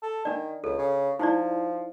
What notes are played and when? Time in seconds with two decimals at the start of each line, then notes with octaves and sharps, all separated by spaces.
0.02 A4
0.25 D#3 D4 D5
0.64 C#2 A4
0.78 C#3
1.19 F3 D#4 E4 D5